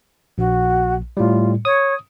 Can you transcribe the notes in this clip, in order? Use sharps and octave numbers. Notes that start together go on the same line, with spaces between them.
A#1 F#4
A2 G3 F4
C#5 D#6